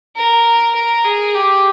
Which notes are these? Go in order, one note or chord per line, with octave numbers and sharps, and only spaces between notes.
A#4
A#4
G#4
G4